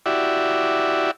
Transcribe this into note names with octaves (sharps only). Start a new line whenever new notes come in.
E4 F#4 G4 D5 E5